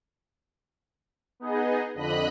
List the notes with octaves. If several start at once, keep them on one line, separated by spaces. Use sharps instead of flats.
B3 D#4 G#4 D#5
F2 D3 D#5 B5 F#6